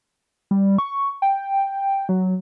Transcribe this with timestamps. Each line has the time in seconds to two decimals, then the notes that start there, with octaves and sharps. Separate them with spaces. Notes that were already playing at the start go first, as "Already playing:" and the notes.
0.51 G3
0.78 C#6
1.22 G5
2.09 F#3